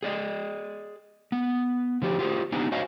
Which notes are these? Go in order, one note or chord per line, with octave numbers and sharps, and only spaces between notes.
G#4 D5 D#5
B3
D3 F3 G4
F4 G4 G#4 C5
B3 D4 D#4 G4 G#5
F#4 C5 C#5 D#5 F5 G#5